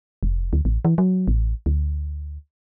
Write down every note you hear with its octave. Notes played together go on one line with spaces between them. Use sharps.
F1
D2
A1
E3
F#3
A1
D2